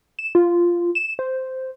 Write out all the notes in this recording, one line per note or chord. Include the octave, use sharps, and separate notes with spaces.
E7
F4
E7
C5